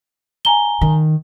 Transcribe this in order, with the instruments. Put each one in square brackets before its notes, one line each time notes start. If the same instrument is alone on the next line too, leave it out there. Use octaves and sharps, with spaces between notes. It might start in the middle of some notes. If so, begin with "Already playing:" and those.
[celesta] G#5 A#5 G7
[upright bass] D#3